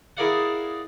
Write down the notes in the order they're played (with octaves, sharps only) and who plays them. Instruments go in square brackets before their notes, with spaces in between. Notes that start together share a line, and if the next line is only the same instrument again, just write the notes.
[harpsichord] E4 G#4 A#4 D5 F5 F#5